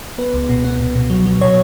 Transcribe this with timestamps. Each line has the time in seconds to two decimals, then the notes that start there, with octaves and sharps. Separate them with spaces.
0.18 B3 B4
0.34 C#2
0.49 B2
0.64 B3
0.80 B2
0.95 B2
1.10 F#3
1.26 F#3
1.41 B2 C#5